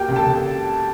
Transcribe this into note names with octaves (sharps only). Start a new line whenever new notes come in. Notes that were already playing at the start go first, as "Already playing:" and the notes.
Already playing: A#3 G4 G5
C#2
A4 A5
C#2